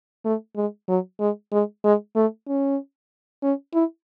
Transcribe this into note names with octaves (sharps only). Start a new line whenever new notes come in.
A3
G#3
F#3
G#3
G#3
G#3
A3
C#4
C#4
E4